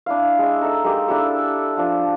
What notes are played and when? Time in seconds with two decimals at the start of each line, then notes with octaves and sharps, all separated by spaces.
0.06 D4 E4 F5
0.39 G#3 E5
0.61 D#4 A4 E5
0.84 G#3 A#3 G4
1.08 D4 E4 G4 A4
1.77 F3 D4